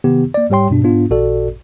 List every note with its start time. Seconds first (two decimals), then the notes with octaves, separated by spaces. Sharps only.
0.04 C3 D#3 B3 G4
0.34 A#3 D5
0.50 G#2 G3 G4 C#5 G5 C6
0.70 G2 B2 D4
0.84 G#2 B3 D4 F4
1.10 A1 A#2 F#4 A4 D5